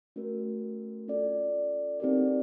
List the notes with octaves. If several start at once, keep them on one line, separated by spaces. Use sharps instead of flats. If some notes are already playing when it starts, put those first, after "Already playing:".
A3 C#4 F#4 A#4
C#4 F4 A4 D5
C4 D#4 G4 A#4 D5